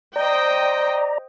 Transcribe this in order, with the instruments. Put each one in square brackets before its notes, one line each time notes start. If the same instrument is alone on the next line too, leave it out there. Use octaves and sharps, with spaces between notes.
[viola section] C5 D#5 G5 [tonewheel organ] D5 A#5